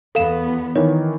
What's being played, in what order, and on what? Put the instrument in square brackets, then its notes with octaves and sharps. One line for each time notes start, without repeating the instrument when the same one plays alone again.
[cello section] E2 B3 [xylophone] A4 F5 E7
[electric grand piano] D#3 E3 [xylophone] C#5